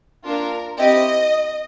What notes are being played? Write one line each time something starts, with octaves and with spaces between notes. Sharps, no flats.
A#3 D4 F4 A#4
C4 E4 G4 D#5